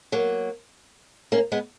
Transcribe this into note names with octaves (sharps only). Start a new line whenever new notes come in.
F#3 A#3
A#3 C#4
G#3 B3